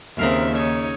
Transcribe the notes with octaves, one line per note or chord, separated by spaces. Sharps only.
D#2 C#3 C4 A#4 E5 F5
D#4 C#5 E5